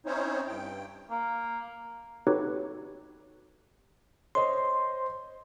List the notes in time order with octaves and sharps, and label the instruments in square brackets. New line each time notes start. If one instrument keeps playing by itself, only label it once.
[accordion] C4 C#4 D#4 E4 C5 C#5
G2 G5
[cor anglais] A#3
[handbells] D#4 F#4 G4 A4 B4 C#5
[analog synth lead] C5 [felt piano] C#5 D#5 [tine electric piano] C6